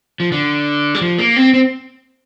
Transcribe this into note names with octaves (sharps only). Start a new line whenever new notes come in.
F3
D3
G3
F3
A#3
C4
C4